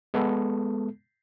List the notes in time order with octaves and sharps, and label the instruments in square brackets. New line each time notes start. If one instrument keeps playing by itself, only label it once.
[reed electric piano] G#3 B3 A4